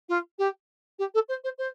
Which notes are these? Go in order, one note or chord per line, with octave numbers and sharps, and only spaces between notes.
F4
G4
G4
A4
C5
C5
C5